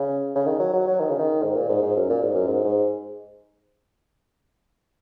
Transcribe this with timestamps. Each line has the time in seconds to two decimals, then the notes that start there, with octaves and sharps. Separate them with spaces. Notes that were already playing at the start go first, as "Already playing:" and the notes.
Already playing: C#3
0.35 C#3
0.47 D#3
0.60 F#3
0.73 F#3
0.88 F#3
1.00 D#3
1.10 C#3
1.19 D#3
1.43 G#2
1.56 A#2
1.69 G#2
1.83 G#2
1.96 F#2
2.10 A#2
2.22 G#2
2.35 F#2
2.48 G#2
2.65 G#2